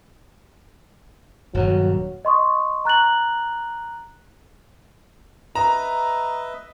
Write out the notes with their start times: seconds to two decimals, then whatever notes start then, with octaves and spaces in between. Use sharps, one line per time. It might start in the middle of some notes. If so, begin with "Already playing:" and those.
1.54 D#1 G2 F#3
2.25 D#5 C6 C#6 D#6
2.85 A#5 F#6 A6 F#7
5.55 B4 D#5 E5 A#5